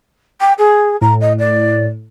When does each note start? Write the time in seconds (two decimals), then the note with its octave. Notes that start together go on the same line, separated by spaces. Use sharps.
0.41 G5
0.58 G#4
1.01 A2 A#5
1.21 D#5
1.39 D5